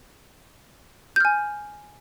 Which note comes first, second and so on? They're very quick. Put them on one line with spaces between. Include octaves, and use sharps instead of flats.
G6 F6 G#5